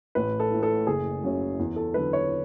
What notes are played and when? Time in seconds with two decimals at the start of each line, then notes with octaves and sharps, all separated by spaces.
0.15 A1 B4
0.40 A4
0.51 A2 E3
0.63 A4
0.87 F#1 G#4
1.23 F#2 C#3 F#3
1.59 E2
1.76 A4
1.94 D3 F#3 B4
2.13 C#5